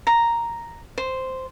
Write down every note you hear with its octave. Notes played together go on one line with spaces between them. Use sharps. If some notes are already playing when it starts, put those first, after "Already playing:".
A#5
C5